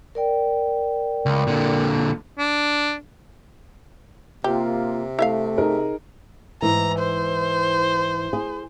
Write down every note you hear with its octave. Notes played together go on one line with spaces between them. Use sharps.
A#4 D5 G5
C#2
A#2 D3
D4
C3 A#3 F4 G4
A3 E4 E5 F5
D#4 G#4 A#4
G#2 E3 A#5
C5
G#4